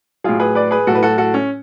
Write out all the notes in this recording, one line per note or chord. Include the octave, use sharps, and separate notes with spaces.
A2 F#3 F4 G#4
G#4 B4
B4 D5
G#4 B4
A2 F#3 F#4 A4
B4
F#4 A4
F#4 A4
C#4